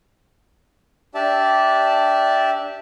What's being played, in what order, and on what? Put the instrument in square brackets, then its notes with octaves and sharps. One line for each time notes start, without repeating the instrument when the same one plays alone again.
[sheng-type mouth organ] D4 G4 D5 E5 A5